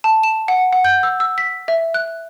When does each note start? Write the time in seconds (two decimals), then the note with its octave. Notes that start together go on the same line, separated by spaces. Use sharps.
0.04 A5
0.23 E7
0.48 F#5
0.73 F#5
0.85 G6
1.03 E6
1.20 E6
1.38 B6
1.68 E5
1.94 F#6